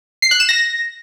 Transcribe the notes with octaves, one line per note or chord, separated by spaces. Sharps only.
C7
F#6
E7
A#6